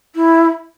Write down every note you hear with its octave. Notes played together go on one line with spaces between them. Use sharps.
E4